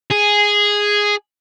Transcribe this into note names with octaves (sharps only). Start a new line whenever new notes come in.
G#4